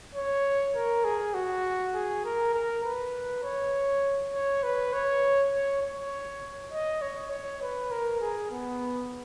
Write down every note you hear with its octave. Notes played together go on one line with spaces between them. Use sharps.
C#5
A#4
G#4
F#4
G#4
A#4
A#4
B4
C#5
C#5
B4
C#5
C#5
C#5
D#5
C#5
C#5
B4
A#4
G#4
B3